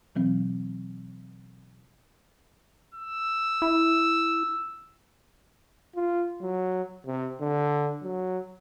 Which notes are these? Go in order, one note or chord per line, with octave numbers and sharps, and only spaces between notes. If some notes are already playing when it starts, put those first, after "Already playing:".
B2 E3 F#3 C4
E6
E4
F4
F#3
C3
D3
F#3